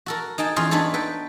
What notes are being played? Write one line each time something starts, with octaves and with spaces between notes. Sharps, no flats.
F#4 A4 A#4
D#4 G#4 G5 A5
E2 C#4 F4 G#4 F5
B3 D4 D#4 A4 C#5
A4 B4 G5